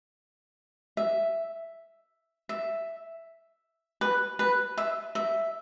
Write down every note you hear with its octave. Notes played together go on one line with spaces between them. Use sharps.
E5
E5
B4
B4
E5
E5